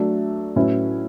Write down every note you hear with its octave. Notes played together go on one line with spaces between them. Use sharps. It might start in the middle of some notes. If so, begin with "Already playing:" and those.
Already playing: F#3 A3 D4
A2 F#3 C#4 E4 B4